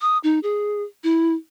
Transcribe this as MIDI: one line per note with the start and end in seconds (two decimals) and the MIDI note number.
0.01 0.18 87
0.24 0.39 63
0.43 0.83 68
1.04 1.33 64